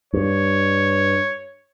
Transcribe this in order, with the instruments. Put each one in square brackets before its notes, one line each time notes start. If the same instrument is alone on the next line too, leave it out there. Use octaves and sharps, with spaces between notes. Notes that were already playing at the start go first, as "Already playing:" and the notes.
[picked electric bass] G2 [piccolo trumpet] C#5